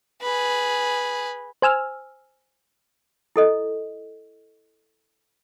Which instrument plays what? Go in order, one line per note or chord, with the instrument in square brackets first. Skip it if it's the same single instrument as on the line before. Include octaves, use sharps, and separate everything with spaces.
[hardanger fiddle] G#4 B4
[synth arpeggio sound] C5 G#5 E6 F6
[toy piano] E4 A4 D#5